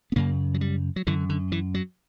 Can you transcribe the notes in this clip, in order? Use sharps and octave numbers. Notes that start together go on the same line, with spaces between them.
B3
F#2 C#3 A#3
F#3
G3
F#3
F#2 D3 E3
D3
E3
F#3